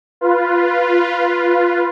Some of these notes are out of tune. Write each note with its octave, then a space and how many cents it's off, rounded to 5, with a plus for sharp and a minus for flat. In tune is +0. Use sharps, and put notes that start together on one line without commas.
F4 +0 B4 -5